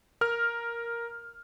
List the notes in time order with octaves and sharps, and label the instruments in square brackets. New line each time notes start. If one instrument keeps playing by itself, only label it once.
[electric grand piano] A#4 F6